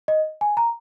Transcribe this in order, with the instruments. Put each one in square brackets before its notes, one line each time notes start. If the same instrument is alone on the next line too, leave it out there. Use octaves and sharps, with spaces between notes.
[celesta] D#5
G#5
A#5